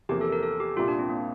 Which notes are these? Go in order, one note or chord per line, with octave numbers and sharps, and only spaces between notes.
E2 C3 F3 A#3 G4
A4
A#4
A4
G4
C2 A#2 G3 F4
D4
C4
A#3